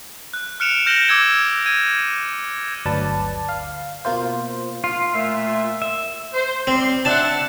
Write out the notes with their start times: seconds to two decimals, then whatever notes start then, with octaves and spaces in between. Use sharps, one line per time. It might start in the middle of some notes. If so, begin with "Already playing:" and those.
0.33 F#6
0.60 F6 F#6 C#7 D7 E7 F7
0.86 F6 G6 A#6 E7 F#7 G7
1.08 D6 E6 G#6 E7
1.66 G#6 D#7
2.86 G1 D2 F#3 B4 D5 A5
3.49 F5
4.05 B2 A#3 F4 C5
4.84 F4
5.14 A#2 A3 E5
5.82 E5
6.33 C5
6.67 G3 C4 C6
7.05 C4 D4 E5 F#5 A5